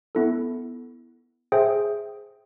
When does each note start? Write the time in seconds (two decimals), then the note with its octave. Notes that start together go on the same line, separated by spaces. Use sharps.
0.15 B3 E4 A4
1.52 G#4 C5 E5 G5